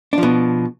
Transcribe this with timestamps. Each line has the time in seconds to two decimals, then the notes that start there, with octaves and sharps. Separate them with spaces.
0.13 D4
0.18 F3
0.23 B2